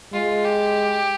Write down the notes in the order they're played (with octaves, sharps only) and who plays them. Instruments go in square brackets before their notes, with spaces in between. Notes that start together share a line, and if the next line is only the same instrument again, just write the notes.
[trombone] G#3 [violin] F4
[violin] G4